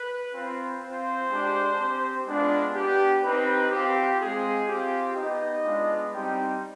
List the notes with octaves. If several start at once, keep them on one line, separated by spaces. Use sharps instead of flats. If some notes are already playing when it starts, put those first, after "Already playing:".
Already playing: B4
C4 F4
C4 F4 C5
G#3 D4 G4
C4 G4
G#3 B3 D4 F4
B3 D4 G4
C4 D#4 G4 B4
C4 F4 G4
G#3 C4 F4 G#4
C4 F4 G4
B3 D#4 G4 D#5
G#3 B3 D4 F4
G3 C4 D#4 G4 G5